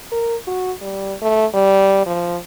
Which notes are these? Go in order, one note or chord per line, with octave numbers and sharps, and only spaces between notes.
A#4
F#4
G3
A3
G3
F3